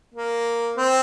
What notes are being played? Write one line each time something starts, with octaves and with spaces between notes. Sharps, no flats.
A#3
C4